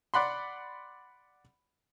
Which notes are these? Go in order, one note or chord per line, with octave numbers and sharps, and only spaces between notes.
D5 F#5 B5 C6